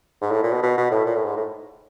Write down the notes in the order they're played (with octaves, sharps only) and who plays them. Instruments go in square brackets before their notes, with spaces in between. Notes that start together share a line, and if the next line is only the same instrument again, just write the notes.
[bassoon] G#2
A2
A#2
B2
B2
B2
A2
A#2
A2
G#2
A2